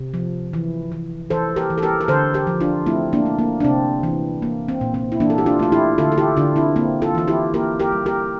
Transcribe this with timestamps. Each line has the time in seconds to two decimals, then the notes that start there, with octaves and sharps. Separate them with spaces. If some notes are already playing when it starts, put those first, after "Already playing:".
Already playing: C3
0.14 F3
0.53 E3
0.92 E3
1.30 E3 A4 C5
1.56 G4 A#4
1.70 E3
1.78 A4
1.82 G4 A#4
2.01 A#4
2.08 D3 A4 C5
2.34 G4 A#4
2.47 F3
2.60 D4 F4
2.86 A3 C4 E4
3.13 A#3 D4
3.26 A3
3.39 A#3
3.60 D4
3.64 C3 C4
4.03 E3
4.42 A#3
4.69 C4
4.81 A#2
4.94 C4
5.12 E4
5.20 E3 A#3 D4
5.30 A4
5.38 G4
5.46 D4 F4
5.59 A3 F4
5.72 E4 G4
5.98 D3 F4 A4
6.12 A4
6.18 E4 G4
6.37 D3 D4 F4
6.56 C4 E4
6.76 A#3 C4
7.02 F4 A4
7.15 E3 F4
7.28 E4 G4
7.54 A#3 G4 A#4
7.80 G4 A#4
7.92 G3
8.06 G4 A#4